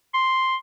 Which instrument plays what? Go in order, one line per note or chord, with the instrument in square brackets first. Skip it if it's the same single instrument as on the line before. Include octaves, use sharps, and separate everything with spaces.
[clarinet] C6